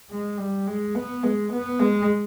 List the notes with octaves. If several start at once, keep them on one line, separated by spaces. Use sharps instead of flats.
G#3
G3
G#3
B3
G#3
B3
G#3